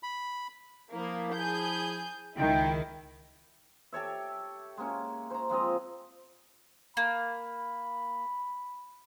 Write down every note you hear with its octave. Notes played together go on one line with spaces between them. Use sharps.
B5
F3 A#3 E4
G#4 G6
C#2 D#3 E4 G5
G4 A4 C#5 E5
G#3 A#3 C#4
C5 A#5
F3 G#3 C4 D#5
A#3 B5